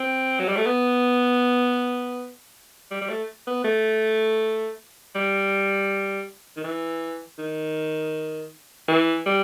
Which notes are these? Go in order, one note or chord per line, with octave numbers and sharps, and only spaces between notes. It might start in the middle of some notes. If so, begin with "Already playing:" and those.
Already playing: C4
F#3
G3
A3
B3
G3
G3
A3
B3
A3
G3
D#3
E3
D#3
E3
G3